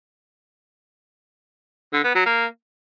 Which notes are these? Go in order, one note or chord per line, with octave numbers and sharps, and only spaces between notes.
D3
B3
F#3
A#3